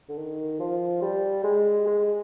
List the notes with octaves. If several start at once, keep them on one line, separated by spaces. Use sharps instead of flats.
D3
D#3
F3
G3
G#3
G#3